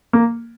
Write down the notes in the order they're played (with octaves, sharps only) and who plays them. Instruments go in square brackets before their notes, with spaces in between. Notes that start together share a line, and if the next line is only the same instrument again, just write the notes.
[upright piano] A#3